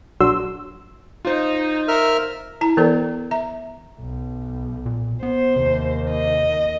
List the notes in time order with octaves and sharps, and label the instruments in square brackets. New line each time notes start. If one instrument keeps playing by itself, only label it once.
[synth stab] B1 F#3 D4 F#4 C6 E6
[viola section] D#4 [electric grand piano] F4 C5
[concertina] A#4 E5 F6
[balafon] E4 A5 A#5
E3 B3 A4 C5 D5
E5 A#5
[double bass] B1
[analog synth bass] A#2
[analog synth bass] B3 [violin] C5
[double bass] D#2 D#3 [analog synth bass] C3
[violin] D#5